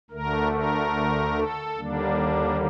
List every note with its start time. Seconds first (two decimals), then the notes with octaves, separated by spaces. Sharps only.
0.10 D2 D3 A3 A#4
0.52 A#4
1.36 A4
1.78 D#2 D3 G3 A#3 D4